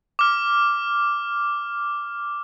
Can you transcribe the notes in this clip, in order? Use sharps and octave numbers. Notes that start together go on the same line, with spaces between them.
D6 F6